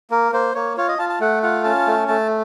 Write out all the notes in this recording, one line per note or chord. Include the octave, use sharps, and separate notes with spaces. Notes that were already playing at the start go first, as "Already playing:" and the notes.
A#3 A#4
A#3 C5
A#3 C#5
F4 C#5
D#5
F4 A5
A5
A3 F#5
F4 F#5
C#4 A5
A3
A3 A5